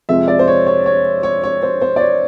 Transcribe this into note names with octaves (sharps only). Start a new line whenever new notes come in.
F2 C3 F3 G#3 E5
D5
C5
C#5
C#5
C#5
C#5
C#5
C5
C5
D5
C#5